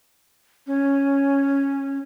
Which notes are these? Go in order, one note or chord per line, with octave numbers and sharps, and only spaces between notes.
C#4